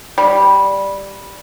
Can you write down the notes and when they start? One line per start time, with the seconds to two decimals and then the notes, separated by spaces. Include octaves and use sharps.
0.18 G3